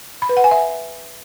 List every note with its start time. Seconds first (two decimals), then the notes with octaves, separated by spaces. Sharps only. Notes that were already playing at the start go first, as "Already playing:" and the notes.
0.22 B5
0.29 B4
0.37 F#5
0.44 G#5
0.51 E5